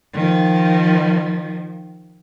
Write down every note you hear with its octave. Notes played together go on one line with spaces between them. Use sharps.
D#3 F3